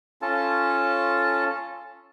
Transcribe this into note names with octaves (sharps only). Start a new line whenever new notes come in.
C#4 F4 A4 A5